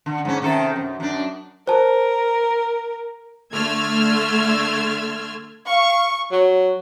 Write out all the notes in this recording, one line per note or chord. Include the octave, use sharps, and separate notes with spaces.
D3
G#2 C#4
C3 D#3 A4
F#2
F#2 D4
A#4 C5 A5
D3 A3 C6 E6 F6 G#6
F5 C#6
F#3